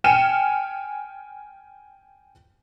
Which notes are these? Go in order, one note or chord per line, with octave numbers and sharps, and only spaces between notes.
G5 G#5 F6 C#7 D#7 E7